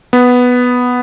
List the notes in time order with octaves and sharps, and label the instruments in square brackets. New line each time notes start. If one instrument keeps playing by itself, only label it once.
[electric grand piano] B3